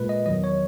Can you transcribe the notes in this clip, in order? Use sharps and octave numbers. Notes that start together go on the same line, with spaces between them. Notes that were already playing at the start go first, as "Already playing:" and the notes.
Already playing: A#2 G#3 B4
D#5
E2 D#3 F#3 D#5
C#5